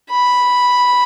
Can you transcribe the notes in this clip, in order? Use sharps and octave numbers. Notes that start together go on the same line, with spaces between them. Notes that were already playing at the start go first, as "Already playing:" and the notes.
B5